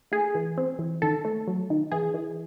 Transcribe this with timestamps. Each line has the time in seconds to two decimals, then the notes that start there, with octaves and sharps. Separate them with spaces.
0.12 A3 G#4
0.35 E3
0.58 C4
0.79 E3
1.02 D#3 A4
1.25 A3
1.47 F#3
1.70 D#3
1.92 E3 G#4
2.14 E3